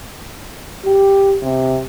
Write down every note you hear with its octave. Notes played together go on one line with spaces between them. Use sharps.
G4
C3